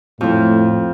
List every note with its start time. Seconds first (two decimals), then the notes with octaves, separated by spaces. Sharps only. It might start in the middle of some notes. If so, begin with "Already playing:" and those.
0.21 F2 A2 F3